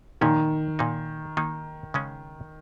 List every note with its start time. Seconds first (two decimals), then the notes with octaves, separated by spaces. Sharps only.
0.21 A#2 D#3 F3 C#4
0.79 A#2 A#3 D#4
1.37 D#3 A#3 D#4
1.94 C#3 G#3 C#4